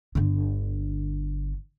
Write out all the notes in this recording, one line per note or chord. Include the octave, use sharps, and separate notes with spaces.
G1 D3